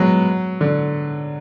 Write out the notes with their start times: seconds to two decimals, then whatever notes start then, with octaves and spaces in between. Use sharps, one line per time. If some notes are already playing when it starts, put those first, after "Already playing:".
Already playing: F#3 G#3 B3
0.61 D3